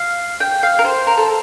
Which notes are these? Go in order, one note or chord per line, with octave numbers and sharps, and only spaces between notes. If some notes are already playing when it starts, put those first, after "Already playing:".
Already playing: F5
G5
F5
A#4
C5
A#4
A4